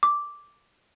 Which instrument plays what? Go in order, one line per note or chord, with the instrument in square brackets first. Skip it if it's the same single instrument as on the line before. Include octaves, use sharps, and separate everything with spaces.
[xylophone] D6